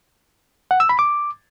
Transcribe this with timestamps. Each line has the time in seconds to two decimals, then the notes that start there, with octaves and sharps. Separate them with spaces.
0.71 F#5
0.80 E6
0.89 B5
0.99 D6